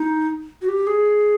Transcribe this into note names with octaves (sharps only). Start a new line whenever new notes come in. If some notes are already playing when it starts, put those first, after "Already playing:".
Already playing: D#4
F#4
G4
G#4